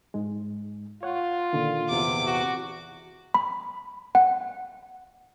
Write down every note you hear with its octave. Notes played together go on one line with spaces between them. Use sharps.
G#2 G#3
F4 C#5 F#5
A#2 D3 D#3
E2 C3 D6
F#4
B5
F#5